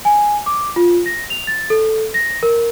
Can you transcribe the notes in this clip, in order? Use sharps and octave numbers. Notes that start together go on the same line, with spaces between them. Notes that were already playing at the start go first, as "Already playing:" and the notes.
G#5
D6
F4
A#6
F7
A6
A4
A#6
A#4